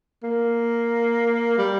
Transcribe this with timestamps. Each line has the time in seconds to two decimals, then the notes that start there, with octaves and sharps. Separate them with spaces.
0.23 A#3
1.58 G3